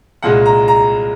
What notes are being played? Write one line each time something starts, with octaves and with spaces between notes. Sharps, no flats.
C2 A#2 G#3 F#5
A#5
A#5